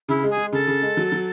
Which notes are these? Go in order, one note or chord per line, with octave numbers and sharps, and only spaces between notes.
C#3 E4
G#3
G#4
G#3
C#3 A4
C#3
G#3
F#3
F#3